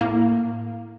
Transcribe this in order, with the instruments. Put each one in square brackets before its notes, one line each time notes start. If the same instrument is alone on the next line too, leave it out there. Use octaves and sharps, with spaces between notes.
[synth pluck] A2 A#3